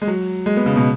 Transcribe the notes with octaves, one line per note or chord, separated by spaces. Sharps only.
G#3
F#3
G#3
B3
C#3
B2